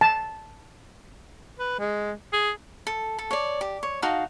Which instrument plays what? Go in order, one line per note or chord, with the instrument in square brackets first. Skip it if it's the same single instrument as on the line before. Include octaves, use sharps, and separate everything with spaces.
[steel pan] A5
[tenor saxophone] B4
G#3
G#4
[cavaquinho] A4
A4
C#5 D5
G4
C#5
D#4 F#4 F5 A5